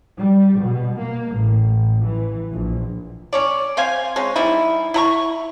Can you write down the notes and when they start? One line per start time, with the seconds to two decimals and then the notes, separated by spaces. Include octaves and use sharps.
0.17 G3
0.59 B2
0.99 A#3
1.34 A1
2.05 E3
2.51 A#1
3.33 C#4 C#5 D5
3.77 C4 C5 F5 G#5
4.16 G#3 C4 C#4
4.35 E3 G3 D#4 E4
4.94 E4 A#5 C#6